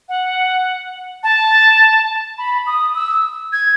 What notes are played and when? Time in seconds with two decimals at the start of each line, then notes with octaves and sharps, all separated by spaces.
0.09 F#5
1.23 A5
2.38 B5
2.67 D#6
2.95 E6
3.53 G#6